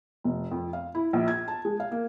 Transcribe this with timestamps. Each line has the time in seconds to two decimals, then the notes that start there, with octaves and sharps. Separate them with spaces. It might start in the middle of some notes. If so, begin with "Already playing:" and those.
0.24 F1
0.51 F2
0.73 F5
0.95 E4
1.13 A#1
1.28 G#6
1.48 A5
1.65 G#3
1.80 F5
1.92 A#3